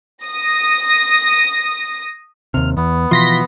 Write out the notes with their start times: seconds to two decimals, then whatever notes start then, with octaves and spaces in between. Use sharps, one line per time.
0.23 D#6 A#6
2.54 D#2 C3 F6
2.77 E2 B3
3.11 B2 E3 F3 C6 A#6 B6